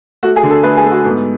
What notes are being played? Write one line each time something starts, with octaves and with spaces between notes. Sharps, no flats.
A3 F#4
G#4
D3
A4
A3 B4
G#4
A3
F#4
G#2 B3